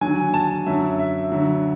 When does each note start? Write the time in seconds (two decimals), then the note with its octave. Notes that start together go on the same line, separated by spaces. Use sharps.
0.01 D#2 D3 F#3 G#5
0.34 A5
0.66 F#2 D3 F#3 E5
0.99 E5
1.32 D2 D3 F#3